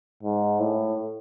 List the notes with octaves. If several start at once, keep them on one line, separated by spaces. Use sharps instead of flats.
G#2
A2